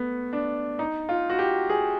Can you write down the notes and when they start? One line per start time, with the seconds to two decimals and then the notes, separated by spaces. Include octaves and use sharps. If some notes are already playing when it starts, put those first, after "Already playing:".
Already playing: A3 B3
0.33 D4
0.79 D#4
1.09 F4
1.30 F#4
1.39 G4
1.70 G#4